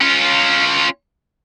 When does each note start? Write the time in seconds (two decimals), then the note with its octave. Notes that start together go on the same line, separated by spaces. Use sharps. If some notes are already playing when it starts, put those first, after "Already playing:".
0.01 C#4 F4